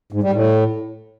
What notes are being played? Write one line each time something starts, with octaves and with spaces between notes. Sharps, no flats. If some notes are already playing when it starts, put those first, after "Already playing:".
G#2
G3
A2